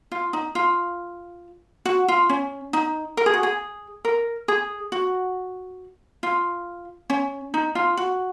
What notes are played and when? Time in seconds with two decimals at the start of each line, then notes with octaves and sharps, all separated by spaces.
0.12 F4
0.33 D#4
0.55 F4
1.85 F#4
2.08 F4
2.29 C#4
2.73 D#4
3.17 A#4
3.26 G#4
3.34 F#4
3.43 G#4
4.05 A#4
4.48 G#4
4.92 F#4
6.23 F4
7.10 C#4
7.54 D#4
7.75 F4
7.97 F#4